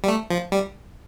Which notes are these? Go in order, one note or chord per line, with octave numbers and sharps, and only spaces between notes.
G3
A3
F3
G3